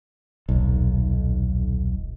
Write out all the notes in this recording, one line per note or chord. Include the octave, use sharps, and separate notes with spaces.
D#1 B1